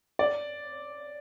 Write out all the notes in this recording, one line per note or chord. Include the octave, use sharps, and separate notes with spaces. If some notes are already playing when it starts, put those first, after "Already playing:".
D5